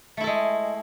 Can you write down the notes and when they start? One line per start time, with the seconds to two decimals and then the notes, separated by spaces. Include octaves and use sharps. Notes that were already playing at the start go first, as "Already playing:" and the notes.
0.17 A3
0.20 E4
0.24 A4
0.27 G#3